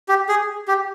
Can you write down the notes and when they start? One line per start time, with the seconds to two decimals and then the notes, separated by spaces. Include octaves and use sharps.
0.08 G4
0.29 G#4
0.68 G4